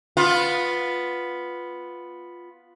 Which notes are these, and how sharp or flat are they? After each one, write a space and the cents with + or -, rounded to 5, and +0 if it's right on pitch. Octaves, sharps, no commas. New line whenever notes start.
B3 +0 F4 +10